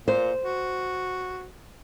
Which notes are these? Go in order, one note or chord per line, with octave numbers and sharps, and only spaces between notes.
A#2 C5
F#4